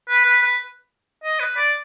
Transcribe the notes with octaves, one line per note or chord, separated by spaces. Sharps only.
B4
B4
B4
D#5
B4
D5